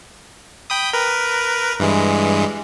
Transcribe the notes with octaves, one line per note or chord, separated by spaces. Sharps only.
G5 B5 D#6
A#4 B4
G2 E3 G#3